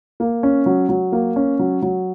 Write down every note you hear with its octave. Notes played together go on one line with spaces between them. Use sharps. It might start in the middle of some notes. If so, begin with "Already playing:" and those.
A#3
C#4
F#3
F#3
A#3
C#4
F#3
F#3